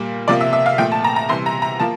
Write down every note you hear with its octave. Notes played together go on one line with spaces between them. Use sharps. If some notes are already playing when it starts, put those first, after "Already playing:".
Already playing: A#2 G3 A#3
C3 F3 A#3 D5
E5
E5
F5
A#2 F3 A3 G5
A5
A#5
A#5
C3 E3 G3 C6
A#5
A#5
F3 A#3 A5